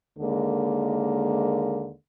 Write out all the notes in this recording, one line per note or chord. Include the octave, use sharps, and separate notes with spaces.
D#2 D3 G#3 A#3